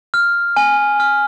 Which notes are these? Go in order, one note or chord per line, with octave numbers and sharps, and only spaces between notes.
F6
G#5
F6